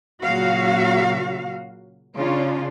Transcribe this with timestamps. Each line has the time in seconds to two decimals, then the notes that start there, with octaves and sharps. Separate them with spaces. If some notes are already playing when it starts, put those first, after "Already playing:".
0.25 A#2 C#3 F#3 F#4 F5
2.17 C#3 C#4 D4 F4